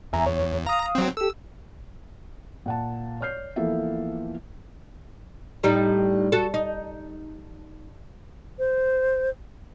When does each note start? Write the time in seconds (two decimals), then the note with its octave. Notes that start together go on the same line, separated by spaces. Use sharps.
0.13 E2 E5 G#5 A#5
0.26 C#5
0.66 F5 A#5 D#6
0.95 F#3 C4
1.17 G4 A4 E6
2.66 A#2 F#5 A5
3.21 C#5 D5 F6 G6 C7
3.56 E3 F3 A#3 B3 A4 E5
5.63 A2 G3 D#4
6.32 F#4 A4
6.54 D#4
8.59 C5